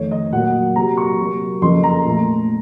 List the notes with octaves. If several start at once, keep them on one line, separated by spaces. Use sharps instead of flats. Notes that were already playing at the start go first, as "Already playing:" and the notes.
Already playing: F2 D#3 A3 C#5
D#5
A#2 F#3 A#3 F#5
C3 F#3 A#3 A#5
C#6
C3 F#3 A#3
F2 C#3 F3 A#3 C6
A#5
A#2 A3